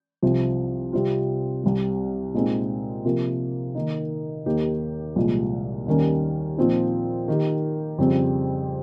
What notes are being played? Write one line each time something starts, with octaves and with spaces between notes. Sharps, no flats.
C2 C3 F3
C3 G3 C4 F4
C2 C3 G3
A#2 G#3 C4 D#4
C3 F3 A#3
D#3 A#3 D#4
D#2 D#3 A#3 D#4 G4
C2 A#2 F3 G#3
D#2 D#3 G3 A#3 C#4
A#2 F3 C4 D#4
D#3 A#3 D#4 G4
F2 C#3 G3 C4